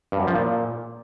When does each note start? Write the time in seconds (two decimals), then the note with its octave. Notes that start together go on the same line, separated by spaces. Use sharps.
0.12 G2
0.20 F#2
0.27 F3
0.35 A#2